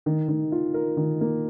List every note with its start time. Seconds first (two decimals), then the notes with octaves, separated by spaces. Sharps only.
0.06 D#3
0.28 D#3
0.52 F4
0.74 A#4
0.97 D#3
1.21 A#3